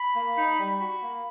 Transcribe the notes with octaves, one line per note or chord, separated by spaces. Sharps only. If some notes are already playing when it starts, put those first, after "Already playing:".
Already playing: B5
A#3
D#4
G3
F#4
A#3